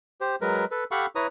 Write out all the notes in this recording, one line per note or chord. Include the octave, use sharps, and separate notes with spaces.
G4 C5
F#3 G#3 A#4 B4
A4 B4
G4 A4 F5 F#5 B5 C#6
E4 B4 C#5 A#5 D#6